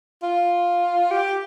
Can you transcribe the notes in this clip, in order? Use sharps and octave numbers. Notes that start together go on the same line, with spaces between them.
F4
G4